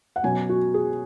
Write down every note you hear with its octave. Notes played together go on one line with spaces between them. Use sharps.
F#5
B2 F#3 C#4 G#5
F#4
G#4